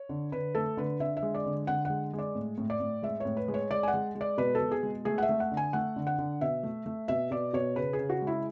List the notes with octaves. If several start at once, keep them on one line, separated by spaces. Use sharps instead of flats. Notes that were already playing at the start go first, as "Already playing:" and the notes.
Already playing: C#5
D3
D3 B4
A3 A4
D3 B4
D3 E5
E5
G#3
D5
D3
D3 F#5
G#3 F#5
G#3
D5
A2
A2
D5
A2
G#3 E5
A2 C#5
B4
G#3
C#5
G#3 D5
G#5
F#5
G#3
G#3
D5
B2 B4
A4
B2
G#4
G#3
A3 G#4
F#5
E5
A3
F#5
D3
G#5
A3 F#5
D3
F#5
D3
B2 E5
A3
A3
B2 E5
B2 D5
B2 C#5
C#3 B4
G#4
C#3
F#4
G#3
E4